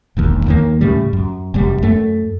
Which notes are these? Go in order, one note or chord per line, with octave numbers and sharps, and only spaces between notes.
E1 A#1 D#2
D#2 D#3 A#3
A2 C#3 G3
F#2
F1 F#2 G3
F#2 A3